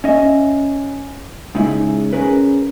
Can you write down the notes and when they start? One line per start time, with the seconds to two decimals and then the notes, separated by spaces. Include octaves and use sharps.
0.04 C#4 D#5 E5
1.55 C#3 G#3 D#4 E4
2.13 C#4 G#4 A#4 B4